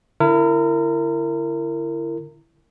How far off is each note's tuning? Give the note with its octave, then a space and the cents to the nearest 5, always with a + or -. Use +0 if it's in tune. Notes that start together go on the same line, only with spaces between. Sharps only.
D3 +0 E4 +25 A#4 -25